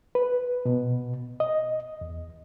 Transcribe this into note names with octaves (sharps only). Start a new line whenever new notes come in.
B4
B2
D#5
E2